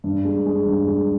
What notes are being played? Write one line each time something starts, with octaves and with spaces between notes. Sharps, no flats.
G2
G#3
G#3
G2
G#3